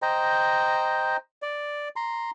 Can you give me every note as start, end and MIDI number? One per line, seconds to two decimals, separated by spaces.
0.02 1.17 72
0.02 1.17 75
0.02 1.17 79
0.02 1.17 82
1.42 1.88 74
1.96 2.31 82
1.96 2.31 84